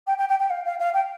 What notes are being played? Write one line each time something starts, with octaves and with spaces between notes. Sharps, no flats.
G5
G5
G5
G5
F5
F5
F5
G5